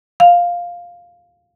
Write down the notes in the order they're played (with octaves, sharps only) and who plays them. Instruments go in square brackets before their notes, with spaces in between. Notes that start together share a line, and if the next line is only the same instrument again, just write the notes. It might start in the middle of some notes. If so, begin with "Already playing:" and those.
[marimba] F5